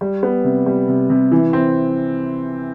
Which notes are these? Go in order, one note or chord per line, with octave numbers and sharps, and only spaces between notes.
G3
B3
C3
G3
C3
C3
E3
C4